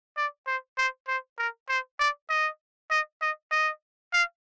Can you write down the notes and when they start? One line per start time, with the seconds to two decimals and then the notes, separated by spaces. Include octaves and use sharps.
0.17 D5
0.47 C5
0.78 C5
1.08 C5
1.38 A#4
1.69 C5
2.00 D5
2.30 D#5
2.91 D#5
3.21 D#5
3.51 D#5
4.13 F5